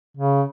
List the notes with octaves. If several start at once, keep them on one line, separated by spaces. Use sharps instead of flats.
C#3